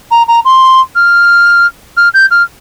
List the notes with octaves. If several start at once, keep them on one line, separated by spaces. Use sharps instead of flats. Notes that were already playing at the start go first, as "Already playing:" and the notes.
A#5
A#5
C6
F6
F6
G6
F6